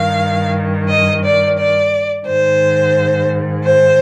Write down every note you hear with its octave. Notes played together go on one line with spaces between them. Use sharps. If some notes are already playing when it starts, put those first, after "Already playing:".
Already playing: G2 D#3 F5
D#5
D5
D5
G#2 D#3 C5
C5